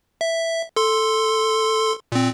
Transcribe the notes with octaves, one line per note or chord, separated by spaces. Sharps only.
E5
A4 C6
A#2 C4